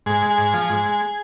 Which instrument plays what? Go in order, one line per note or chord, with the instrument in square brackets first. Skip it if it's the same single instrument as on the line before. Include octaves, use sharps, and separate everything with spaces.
[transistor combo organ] G#2 G#4
G#3
G#4
G#2
F3
G#2
G#3